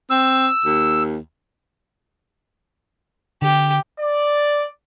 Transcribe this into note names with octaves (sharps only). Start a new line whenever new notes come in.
C4 E6
D#2
D3 G4
D5